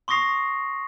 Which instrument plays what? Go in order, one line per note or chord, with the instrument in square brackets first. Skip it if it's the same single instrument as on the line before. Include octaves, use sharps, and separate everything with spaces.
[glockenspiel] C6 C#6 D#6 A#6 C7 F7